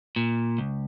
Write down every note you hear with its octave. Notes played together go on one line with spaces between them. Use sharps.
A#2
C#2